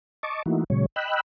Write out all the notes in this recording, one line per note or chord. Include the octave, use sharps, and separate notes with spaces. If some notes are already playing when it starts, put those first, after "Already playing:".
D#5 A5 C#6 D6
E3 A3 A#3 D#4 E4 F#4
A#2 C#3 F#3 G#3 C#5
D#5 G5 B5 E6 F#6